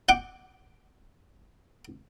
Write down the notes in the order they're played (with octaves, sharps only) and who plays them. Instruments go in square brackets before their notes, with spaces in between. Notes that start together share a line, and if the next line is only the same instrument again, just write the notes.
[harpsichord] F#5 G5 D6